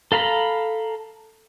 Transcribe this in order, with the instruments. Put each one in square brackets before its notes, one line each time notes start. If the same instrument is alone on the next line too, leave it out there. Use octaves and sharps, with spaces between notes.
[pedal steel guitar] A4 F5 A#5 B5